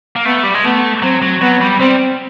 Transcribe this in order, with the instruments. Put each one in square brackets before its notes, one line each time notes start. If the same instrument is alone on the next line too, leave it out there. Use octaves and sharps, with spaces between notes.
[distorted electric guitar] A#3
[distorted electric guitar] A3 [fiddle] B3
[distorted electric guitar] G3
G#3
[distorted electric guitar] A3 [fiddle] B3
[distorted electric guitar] F#3 [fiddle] C4
[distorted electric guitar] F#3
[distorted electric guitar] F#3 [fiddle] B3
[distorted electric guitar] G3
[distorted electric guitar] G3 [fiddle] C4